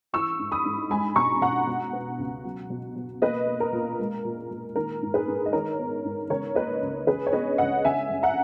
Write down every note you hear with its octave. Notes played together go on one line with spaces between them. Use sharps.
E3 C#6 E6
G#2
B5 D#6
G#2
G#3 G#5 B5
B2 A#5 C#6
B2 F#5 A#5
B2
B3
C#2
F#3
B2
B2
A#3 B4 D#5
A#3
A#4
A#2
G#3
A#2
A#2
D#3 A#4
G#2
G#4 B4
G#2
D#5
D#3 A#4 C#5
B3
G#2
C#3 A#4 C#5
A#3 B4 D#5
C#2
C#3 G#4 B4
C#5
B3 B4 D#5
C#2 D#5 F#5
C#3 E5 G#5
F#2
F#5 A#5